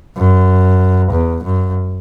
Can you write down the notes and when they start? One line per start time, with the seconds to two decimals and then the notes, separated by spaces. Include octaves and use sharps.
0.17 F#2
1.11 E2
1.44 F#2